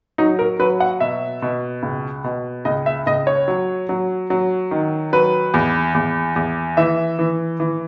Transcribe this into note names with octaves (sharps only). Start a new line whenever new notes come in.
F#3 D#4
A#4
F#3 B4
F#5
B2 E5
B2
C#2
B2
C#2 D#5
E5
C#2 D#5
C#5
F#3
F#3
F#3
D#3
F#3 B4
E2
E2
E2
E3 E5
E3
E3